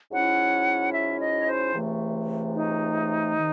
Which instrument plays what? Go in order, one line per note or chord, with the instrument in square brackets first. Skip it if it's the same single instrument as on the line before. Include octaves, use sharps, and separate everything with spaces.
[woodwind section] G#2 F#3 C#4 E4 [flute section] F#5
[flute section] E5
D#5
C#5
C5
[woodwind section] C#2 C3 E3 A3
[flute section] D#4
[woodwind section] C3 D#3